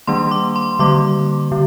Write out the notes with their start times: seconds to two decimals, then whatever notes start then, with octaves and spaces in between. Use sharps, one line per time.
0.07 D#3 G3 A#3 D4 C6
0.31 D6
0.56 C6
0.79 D3 G3 A#3 D6
1.52 D3